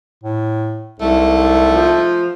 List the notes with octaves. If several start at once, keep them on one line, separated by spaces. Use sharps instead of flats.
A2
C2 G#2 C3 A3
F3